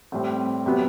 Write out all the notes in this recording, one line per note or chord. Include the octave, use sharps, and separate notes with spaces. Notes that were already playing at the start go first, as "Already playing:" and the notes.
A2 G3 C4
C3 F#3 B3